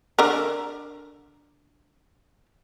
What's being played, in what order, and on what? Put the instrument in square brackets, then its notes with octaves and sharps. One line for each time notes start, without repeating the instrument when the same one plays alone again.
[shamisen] D3 A#4